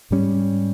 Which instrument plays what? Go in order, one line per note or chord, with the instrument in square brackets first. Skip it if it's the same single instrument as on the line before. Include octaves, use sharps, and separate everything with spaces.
[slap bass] G#2 G3 C#4